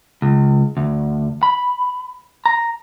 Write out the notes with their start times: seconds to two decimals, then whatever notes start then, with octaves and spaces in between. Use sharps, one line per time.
0.22 C#2
0.77 D2
1.43 B5
2.46 A#5